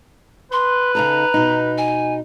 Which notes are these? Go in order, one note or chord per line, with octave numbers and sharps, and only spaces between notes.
B4 C6
C#3 D#4 A4 A#5
B2 D#4
G#5